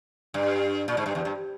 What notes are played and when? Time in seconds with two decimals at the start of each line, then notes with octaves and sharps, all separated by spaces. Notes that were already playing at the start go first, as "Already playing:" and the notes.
0.34 G2
0.88 A#2
0.97 G#2
1.06 G2
1.15 E2
1.25 G2